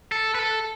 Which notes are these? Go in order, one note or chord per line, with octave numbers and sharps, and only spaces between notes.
A4
B4
A4